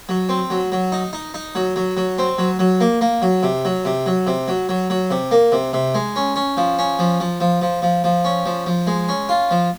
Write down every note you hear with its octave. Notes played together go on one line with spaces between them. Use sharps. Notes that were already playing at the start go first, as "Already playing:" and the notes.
F#3
C4
F#3
F#3
D#4
D#4
D#4
F#3
F#3
F#3
C4
F#3
F#3
A#3
A#3
F#3
C3
F#3
C3
F#3
C3
F#3
F#3
F#3
C3
A#3
C3
C3
G#3
C#4
C#4
F3
C#4
F3
F3
F3
F3
F3
F3
C#4
F3
F3
G#3
C#4
F4
F3